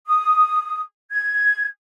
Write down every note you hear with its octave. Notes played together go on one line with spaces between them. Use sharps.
D#6
G#6